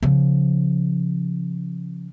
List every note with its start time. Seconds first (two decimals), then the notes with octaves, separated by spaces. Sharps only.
0.03 C#3 F3